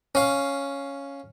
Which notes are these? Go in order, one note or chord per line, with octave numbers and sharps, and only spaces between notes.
C#4 F5